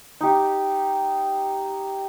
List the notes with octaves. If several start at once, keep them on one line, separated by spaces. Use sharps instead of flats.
D#4 G4